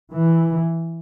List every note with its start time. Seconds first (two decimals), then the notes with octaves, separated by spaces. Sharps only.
0.11 E3